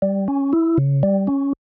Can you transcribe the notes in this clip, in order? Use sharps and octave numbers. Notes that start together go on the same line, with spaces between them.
G3
C#4
E4
C#3
G3
C#4